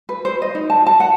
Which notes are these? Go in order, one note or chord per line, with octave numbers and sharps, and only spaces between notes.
B4
C5
D#5
D#4
A5
A5
F#5